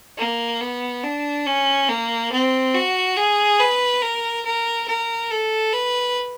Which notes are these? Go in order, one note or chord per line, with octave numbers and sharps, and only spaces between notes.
A#3
B3
D4
C#4
A#3
C4
F#4
G#4
B4
A#4
A#4
A#4
A4
B4